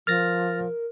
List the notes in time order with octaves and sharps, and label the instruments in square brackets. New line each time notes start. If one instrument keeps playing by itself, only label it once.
[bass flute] F3 [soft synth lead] A#4 [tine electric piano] F6 A6 A#6